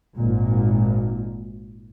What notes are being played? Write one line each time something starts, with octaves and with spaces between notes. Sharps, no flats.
G#1 A#2